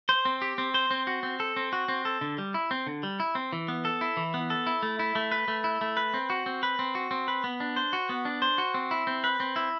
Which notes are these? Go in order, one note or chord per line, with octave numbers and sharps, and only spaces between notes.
C5
C4
G4
C4
C5
C4
F#4
C4
A4
C4
F#4
C4
A4
D3
G3
E4
C4
D3
G3
E4
C4
E3
B3
A4
E4
E3
B3
A4
E4
A3
E4
A3
B4
A3
E4
A3
B4
C4
F#4
C4
B4
C4
F#4
C4
B4
B3
D4
C5
F#4
B3
D4
C5
F#4
C4
E4
C4
B4
C4
E4